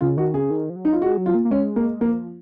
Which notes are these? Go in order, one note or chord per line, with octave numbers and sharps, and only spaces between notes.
C#3 F4
D#3 F#4
C#3 G#4
D#3
F3
F#3
D#4
F4
G#3 F#4
F#3
F4
A#3
A#3
G#3 C#4
A#3
F3 A#3